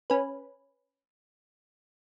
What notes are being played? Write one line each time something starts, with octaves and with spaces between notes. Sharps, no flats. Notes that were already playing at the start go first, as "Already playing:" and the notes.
C#4 B4